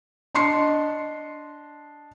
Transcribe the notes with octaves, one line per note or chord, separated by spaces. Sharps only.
D4 D#5 C6 C7 C#7